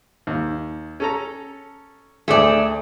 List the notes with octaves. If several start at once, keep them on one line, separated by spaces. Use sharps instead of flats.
D#2
C#4 A4 A#5
D2 A3 G#4 D5